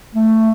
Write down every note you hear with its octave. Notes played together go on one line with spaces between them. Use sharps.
A3